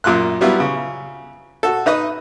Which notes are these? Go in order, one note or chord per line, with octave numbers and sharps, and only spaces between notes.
F#2 A#2 F4 C6 F#6
F#3 G3 B3 E4 F4
C#3
F#4 A4
D#4 B4 D#5